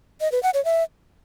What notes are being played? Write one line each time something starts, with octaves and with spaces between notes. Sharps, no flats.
D#5
B4
F#5
C#5
E5